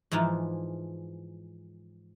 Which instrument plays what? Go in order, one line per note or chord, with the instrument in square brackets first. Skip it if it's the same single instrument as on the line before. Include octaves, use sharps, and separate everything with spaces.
[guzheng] G#2 E3 F3 E4 F4